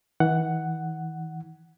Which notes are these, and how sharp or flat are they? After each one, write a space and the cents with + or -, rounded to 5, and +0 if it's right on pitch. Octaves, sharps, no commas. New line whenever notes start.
E3 -45 F#5 +5